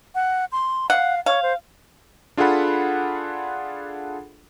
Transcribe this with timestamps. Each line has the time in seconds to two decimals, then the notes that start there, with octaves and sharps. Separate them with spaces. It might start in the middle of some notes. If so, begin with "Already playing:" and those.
0.15 F#5
0.52 C6
0.90 F5 F#5
1.26 C#5 F5
1.43 C5
2.37 D4 F4 G#4 A4 F#5 B5